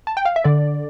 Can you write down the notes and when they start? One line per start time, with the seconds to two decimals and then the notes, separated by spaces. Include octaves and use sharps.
0.07 A5
0.17 G5
0.25 F5
0.36 E5
0.44 D3 D5